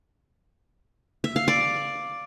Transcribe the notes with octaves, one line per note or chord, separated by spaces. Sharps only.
E5
F5
D5